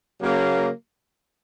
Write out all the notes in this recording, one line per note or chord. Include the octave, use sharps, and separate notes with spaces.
C#3 F#3 A#3